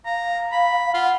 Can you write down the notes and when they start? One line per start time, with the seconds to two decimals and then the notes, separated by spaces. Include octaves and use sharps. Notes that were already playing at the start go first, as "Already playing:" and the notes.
0.05 F5 A#5
0.52 B5
0.94 F4 F#5